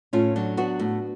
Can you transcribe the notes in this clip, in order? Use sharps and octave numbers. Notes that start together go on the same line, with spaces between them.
A2 C#4 F4
F#3 D4
B3 D4 F#4
A2